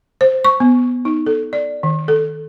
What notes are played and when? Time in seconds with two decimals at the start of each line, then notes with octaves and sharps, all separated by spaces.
0.21 C5
0.45 C#6
0.60 B3
1.05 D#4
1.26 A4
1.53 D5
1.83 D#3
2.08 A4